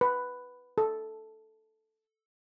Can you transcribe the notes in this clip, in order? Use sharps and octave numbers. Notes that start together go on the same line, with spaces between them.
B4
A4